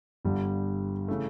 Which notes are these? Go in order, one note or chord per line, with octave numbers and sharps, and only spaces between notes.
G1 G2 D3 G3
C#3 E3 A3